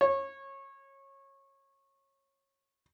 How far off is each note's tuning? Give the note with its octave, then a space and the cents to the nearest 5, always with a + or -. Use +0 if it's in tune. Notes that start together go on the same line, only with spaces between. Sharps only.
C#5 -25